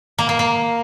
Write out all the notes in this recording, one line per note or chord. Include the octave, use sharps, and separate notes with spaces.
A#3
A#3
A#3